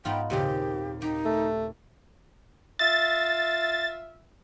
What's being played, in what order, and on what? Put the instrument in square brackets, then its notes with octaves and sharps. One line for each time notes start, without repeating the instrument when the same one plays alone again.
[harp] G#2 [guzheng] B3 D#4 F4 [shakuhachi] G5
[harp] D#2 C#3 G6 [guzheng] A#2 C4 G#4 [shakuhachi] G4
[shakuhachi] D#4 [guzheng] G4
[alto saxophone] A3
[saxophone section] F4 E5 [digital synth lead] A6